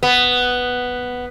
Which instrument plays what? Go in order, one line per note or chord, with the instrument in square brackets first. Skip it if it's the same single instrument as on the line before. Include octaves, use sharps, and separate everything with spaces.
[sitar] B3